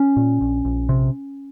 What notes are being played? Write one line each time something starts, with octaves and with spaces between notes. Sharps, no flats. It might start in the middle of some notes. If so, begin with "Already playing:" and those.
Already playing: C#4
A#2
A#1
A#1
C3